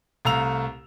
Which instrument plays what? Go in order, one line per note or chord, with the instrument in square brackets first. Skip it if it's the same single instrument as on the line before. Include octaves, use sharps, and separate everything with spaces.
[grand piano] C2 A3 F5 A#5 E6 F7